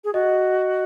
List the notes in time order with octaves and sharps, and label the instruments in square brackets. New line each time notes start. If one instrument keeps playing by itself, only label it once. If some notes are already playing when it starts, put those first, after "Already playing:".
[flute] G#4
[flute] F#4 [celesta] D#5